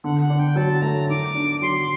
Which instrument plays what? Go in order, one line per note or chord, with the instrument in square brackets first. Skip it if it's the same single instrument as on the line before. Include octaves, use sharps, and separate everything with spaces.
[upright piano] D3 [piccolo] F#5
[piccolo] F#5
[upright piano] D4
[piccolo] G5
[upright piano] F#3 [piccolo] A5
[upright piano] A3 [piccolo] A#5
[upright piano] D#3 [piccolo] D6
[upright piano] D4
[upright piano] F#3 [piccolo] C6